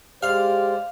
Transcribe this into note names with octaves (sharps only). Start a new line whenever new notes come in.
G#3 G4 C5 D5 F5